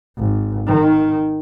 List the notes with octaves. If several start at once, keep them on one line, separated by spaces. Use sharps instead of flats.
G#1
D#3